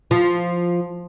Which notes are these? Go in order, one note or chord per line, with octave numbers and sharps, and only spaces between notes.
F3